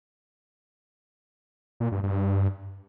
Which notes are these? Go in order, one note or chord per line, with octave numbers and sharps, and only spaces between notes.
A#2
G2
G2